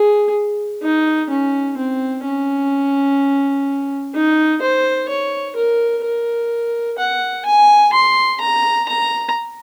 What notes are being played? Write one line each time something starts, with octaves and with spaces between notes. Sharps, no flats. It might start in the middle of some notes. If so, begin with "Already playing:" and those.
Already playing: G#4
D#4
C#4
C4
C#4
D#4
C5
C#5
A#4
A#4
F#5
G#5
C6
A#5
A#5